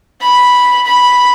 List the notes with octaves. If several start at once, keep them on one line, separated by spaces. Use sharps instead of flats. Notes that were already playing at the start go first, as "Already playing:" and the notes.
B5
B5